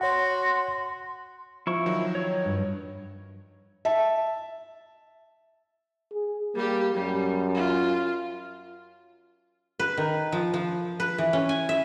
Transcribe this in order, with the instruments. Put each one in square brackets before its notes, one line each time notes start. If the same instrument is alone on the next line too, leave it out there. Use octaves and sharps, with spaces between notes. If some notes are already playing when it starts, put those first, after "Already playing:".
[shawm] F#4 [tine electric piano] C#5 F#5 [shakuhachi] C6
[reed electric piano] F3 [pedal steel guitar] E4 C#6
[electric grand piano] D#3 F#3
[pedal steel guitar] C#5
[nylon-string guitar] G2
[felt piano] E5 A5
[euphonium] G#4
[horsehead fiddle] G3 G4 [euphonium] A#3
[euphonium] F#2 [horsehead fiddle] G3
[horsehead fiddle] F4
[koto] B4
D#3
F3
F3
B4
E3
C#4
G#5
E5